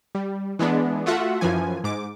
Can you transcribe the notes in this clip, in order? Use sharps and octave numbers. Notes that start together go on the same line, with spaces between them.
G3
E3 G#3 B3 D4
A3 F4 F#4 E5 F#5
F#2 E3 F3 G#5
G#2 D6